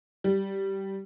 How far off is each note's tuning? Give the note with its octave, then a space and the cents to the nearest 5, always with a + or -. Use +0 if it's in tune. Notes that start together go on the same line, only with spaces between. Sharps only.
G3 -10